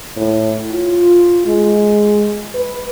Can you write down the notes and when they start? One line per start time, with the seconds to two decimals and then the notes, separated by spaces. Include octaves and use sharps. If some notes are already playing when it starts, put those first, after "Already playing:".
0.17 A2
0.72 F4
1.47 G#3
2.54 B4